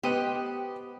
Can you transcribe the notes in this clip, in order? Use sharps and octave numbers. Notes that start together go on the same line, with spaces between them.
B3 G4 C5 D#5 F#5